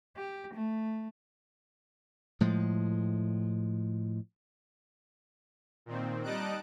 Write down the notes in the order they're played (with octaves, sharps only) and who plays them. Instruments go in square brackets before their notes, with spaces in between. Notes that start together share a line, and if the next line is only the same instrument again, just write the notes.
[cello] G4
A3
[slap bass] A2 F3 G#3
[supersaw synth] A#2 D#3 C4
G3 D#4 D#5 A5 F#6 D7